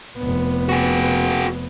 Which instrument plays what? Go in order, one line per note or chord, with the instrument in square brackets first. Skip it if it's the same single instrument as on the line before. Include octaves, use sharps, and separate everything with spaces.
[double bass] F1 B3
[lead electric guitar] F#4 G#4